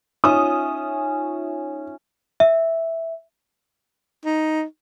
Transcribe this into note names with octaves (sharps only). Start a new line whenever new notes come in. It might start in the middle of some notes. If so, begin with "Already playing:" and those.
C#4 D#4 F4 E5 D#6
E5
D#4